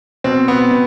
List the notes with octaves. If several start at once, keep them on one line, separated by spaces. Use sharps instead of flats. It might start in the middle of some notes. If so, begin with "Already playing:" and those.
B2 C4
B3
B2